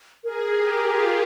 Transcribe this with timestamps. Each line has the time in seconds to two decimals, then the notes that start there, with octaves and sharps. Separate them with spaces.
0.24 G#4 A#4
0.56 G4
0.87 F4